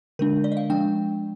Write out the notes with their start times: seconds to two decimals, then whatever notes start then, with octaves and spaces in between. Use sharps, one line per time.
0.19 D3 G#3 D4 A#4
0.44 D5
0.52 D#5
0.57 F5
0.70 F3 G#3 D4 G5